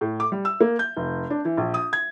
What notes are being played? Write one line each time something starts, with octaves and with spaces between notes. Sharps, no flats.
A2
D6
G3
E6
A#3
G6
F1
D4
E3
A#1
D#6
G#6